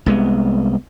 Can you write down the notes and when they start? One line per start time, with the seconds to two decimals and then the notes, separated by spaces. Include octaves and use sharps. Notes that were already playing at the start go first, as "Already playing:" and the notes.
0.06 C2 G#3 B3